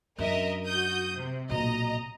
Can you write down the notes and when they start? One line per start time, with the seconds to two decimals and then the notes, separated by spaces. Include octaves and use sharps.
0.18 F#2 D4 A#4 D#5 E5
0.66 F#4 D#6 G6
1.16 C3
1.50 B1 A#2 D#5 A#5